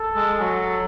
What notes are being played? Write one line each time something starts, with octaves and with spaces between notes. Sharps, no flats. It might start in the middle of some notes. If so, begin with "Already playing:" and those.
Already playing: A4
G#3
F#3